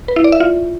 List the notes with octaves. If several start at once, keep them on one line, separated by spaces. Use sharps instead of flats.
B4
E4
D5
E5
F4